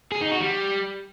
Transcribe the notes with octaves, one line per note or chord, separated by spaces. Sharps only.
G#4
D#4
F#4
G3